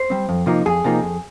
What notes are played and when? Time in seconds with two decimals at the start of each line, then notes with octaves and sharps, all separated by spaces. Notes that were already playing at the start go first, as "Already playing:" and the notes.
Already playing: C5
0.10 G3 C4
0.29 F2
0.46 C3 F3 A#3 D#4
0.66 F2 G#4
0.84 C3 F3 A#3 D#4
1.02 F2